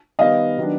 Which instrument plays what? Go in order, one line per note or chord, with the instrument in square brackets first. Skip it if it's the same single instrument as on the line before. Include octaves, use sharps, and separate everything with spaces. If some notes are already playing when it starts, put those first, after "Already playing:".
[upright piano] D#3 G3 B3 D#5 F5
D#3 F#3 B3 D4